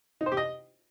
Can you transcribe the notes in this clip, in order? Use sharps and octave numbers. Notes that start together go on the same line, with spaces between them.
D#4
C5
G4
D#5